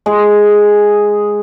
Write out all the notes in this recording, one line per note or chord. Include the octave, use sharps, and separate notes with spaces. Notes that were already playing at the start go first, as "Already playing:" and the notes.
G#3 G#4